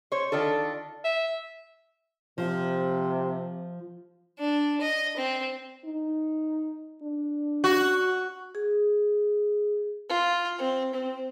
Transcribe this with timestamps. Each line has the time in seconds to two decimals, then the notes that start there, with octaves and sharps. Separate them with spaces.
0.12 C5 C#5
0.32 D#3 D4 F4 A4
1.05 E5
2.38 C3 F3
4.39 D4
4.81 D#5
5.17 C4
5.85 D#4
7.02 D4
7.64 F#4
8.55 G#4
10.09 F4
10.58 C4
10.94 C4